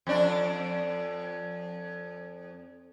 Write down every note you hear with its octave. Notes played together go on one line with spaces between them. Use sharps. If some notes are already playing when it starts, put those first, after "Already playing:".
F2 D4